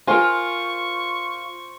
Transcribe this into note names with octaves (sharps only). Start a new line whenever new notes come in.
F4 A#4 C5 G#5 C#6